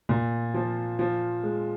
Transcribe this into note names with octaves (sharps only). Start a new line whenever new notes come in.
A#2
F3
F3
G#3